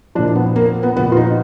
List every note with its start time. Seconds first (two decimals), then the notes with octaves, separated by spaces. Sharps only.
0.15 F3 D4
0.19 A#2
0.36 B3
0.56 A#3
0.83 B3
0.96 A#2 F3 B3
1.12 F4
1.17 D#4